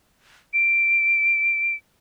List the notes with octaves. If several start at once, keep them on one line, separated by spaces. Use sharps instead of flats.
D7